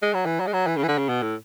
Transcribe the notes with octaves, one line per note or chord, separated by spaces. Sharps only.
G#3
F#3
E3
F#3
G#3
F#3
E3
C#3
E3
D3
C#3
B2
A2